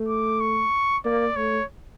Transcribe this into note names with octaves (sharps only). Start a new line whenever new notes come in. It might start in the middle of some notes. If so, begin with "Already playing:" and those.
Already playing: A3
D6
C#6
A#3 D5
A3 C#5